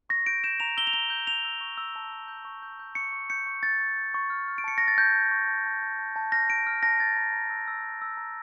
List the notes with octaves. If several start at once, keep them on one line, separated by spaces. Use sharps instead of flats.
C#6 A#6
G6 D7
G6 E7
A#5 F7
E6 G7
F7
A#5 G7
G6
G6 F7
E6
C#6
E6
A5
E6
G6
C#6
G6
G6
C#6 C#7
C#6
G6 C#7
C#6
G6 A6
C#6
G6
C#6
F6
F6
D7
A5 C#7
F6 A#6
A6
A5 G6
A5
C#6
A5
A5
A5
A5
A5
F6 A#6
F6 D7
F6
A5 A#6
G6 A6
A#5
A#5
E6
E6
E6
E6
A#5